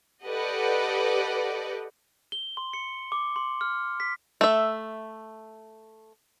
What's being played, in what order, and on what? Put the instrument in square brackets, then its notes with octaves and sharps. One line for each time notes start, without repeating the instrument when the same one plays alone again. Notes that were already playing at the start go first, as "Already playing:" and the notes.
[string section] G4 A4 B4 D5 D#5 F#5
[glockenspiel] G7
C6
C#7
D6
C6
F6
B6
[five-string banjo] A3 E5